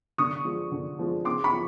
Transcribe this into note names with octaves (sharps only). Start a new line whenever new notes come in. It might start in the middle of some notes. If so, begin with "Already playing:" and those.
D3 C#6 D#6
F3 G#3
D3
F3 G#3
C#3 C6 D6
B5 C#6
F3